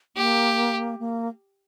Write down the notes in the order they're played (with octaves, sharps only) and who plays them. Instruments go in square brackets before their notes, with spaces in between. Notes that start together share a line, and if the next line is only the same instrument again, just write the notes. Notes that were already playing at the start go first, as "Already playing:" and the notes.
[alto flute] A#3 [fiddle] G4
[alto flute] A#3